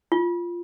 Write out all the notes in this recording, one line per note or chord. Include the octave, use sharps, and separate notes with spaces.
F4